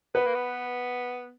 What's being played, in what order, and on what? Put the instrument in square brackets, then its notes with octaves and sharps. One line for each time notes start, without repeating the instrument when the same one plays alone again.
[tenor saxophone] B3 [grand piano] B4
[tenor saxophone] A#3
B3